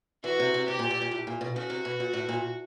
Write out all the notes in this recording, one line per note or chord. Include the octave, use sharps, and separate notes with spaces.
E3 F#4
C3
C3
C3 G4
A#2
A#2
A#2
A2
A#2
B2
C#3 F#4
C3
B2
A#2
A2
A#2